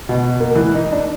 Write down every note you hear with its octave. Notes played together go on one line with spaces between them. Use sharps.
B2
A#3
E3
D#4
D4